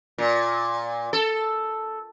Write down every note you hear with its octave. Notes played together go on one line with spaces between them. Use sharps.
A#2
A4